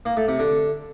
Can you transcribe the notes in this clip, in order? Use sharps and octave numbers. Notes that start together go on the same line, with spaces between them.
A#3
A3
C3
D3